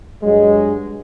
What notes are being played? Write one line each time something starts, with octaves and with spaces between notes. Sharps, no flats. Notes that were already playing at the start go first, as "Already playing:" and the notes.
G2 F#3 G#3